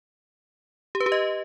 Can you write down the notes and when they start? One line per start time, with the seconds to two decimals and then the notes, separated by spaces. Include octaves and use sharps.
0.95 G4
1.00 B4
1.06 G4
1.12 D#5